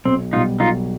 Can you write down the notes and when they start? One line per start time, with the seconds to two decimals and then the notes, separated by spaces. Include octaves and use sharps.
0.05 B1 C4
0.32 B2 G3 B3 D#4 F4
0.60 B1 D#4 F4